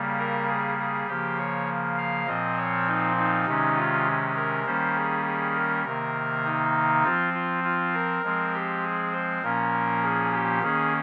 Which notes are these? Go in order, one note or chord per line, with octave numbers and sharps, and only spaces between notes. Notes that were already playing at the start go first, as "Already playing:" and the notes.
Already playing: C#3 G3 A#3
A#4
G#4
G#4
C#3 F3 A#3 G4
C#5
F5
A#2 F3 C4 D#5
C#5
D#4
D#4
C3 D#3 G#3 C#4
F4
A#4
D#3 G3 A#3 C#4 C5
G#4
G#4
A#4
C3 D#3 A#3 A#4
D#4
F3 C4 F4
F4
F4
A#4
F3 G#3 C4
G4
G#4
C5
A#2 F3 A#3 C#4 A#4
G#4
G4
D#3 A#3 C#4 G#4